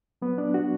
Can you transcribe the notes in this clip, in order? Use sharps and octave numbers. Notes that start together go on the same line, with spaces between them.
F#3 B3
D4
F#4